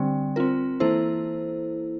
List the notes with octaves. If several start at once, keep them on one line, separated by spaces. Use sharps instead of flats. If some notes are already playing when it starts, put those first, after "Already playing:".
Already playing: D3 G3 C4
C4 F4 A#4
E3 A#3 E4 A4 C5